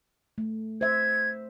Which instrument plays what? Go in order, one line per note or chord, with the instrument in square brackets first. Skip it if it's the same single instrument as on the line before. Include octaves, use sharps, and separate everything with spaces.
[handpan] A3
[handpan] C5 E5 [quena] G#6